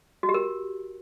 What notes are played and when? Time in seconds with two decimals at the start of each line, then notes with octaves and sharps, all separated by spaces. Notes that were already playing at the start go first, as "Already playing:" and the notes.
0.23 F#4
0.29 G4
0.34 A#4